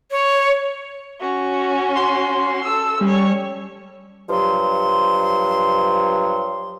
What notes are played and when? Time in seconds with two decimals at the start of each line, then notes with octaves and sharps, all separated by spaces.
0.11 C#5
1.20 C#4 F#4
1.96 C6
2.64 A4 E6
3.01 G3 C#4 C#5
4.29 G2 F3 F#3 C6